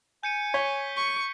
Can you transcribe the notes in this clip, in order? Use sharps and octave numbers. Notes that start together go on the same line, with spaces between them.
G#5 G6 C#7 D#7
C#5 G#6 B6 G7
C#6